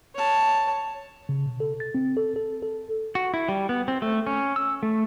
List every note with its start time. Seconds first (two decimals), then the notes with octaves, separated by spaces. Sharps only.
0.16 C#5 A5
1.29 C#3
1.46 B2
1.60 A4
1.80 A6
1.95 C4
2.17 A4
2.36 A4
2.62 A4
3.15 F#4
3.34 E4
3.49 G3
3.69 B3
3.88 C4
4.02 A3
4.27 C#4
4.56 E6
4.83 A3